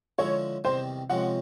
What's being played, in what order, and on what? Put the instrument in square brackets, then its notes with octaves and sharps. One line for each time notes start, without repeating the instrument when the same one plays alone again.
[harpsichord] D3 F3 G#3 C#4 E4 [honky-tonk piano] C#5
[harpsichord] E2 C3 D#3 G3 [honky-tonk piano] C5
[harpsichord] F2 C3 F3 G#3 C#4 [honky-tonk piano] F#5